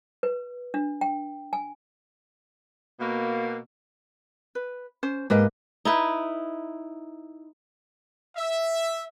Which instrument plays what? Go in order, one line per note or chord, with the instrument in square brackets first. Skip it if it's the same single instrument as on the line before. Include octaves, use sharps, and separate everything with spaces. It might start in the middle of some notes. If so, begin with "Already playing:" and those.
[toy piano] B4
D4
G5
G#5
[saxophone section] B2 A#3
[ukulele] B4
C#4 C5
[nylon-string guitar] G#2 A#3 [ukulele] G4 B4 D#5
[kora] D#4 E4 B4
[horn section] E5